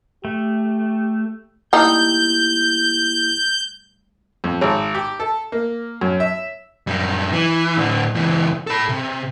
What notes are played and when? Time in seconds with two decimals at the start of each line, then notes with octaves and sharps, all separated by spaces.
0.25 A3 G4
1.73 G3 A3 A#3 D#4 E4 G4 G6
4.44 F2
4.61 G#1
4.95 G4
5.20 A4
5.52 A#3
6.01 F#2
6.20 E5
6.87 F#2 G3
7.32 E3
7.77 A2 D3
8.15 C#2 E3
8.67 A4 B5
8.89 C3